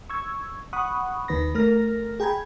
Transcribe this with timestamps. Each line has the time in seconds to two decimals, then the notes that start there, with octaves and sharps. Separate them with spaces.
0.10 C#6 E6 G#6
0.73 F#5 B5 C#6 D#6 F#6
1.28 D#2 D#3 B4 B5 A#6
1.55 A3 A#4 F6 A#6
2.20 G#4 G5 A#5 B5 G#6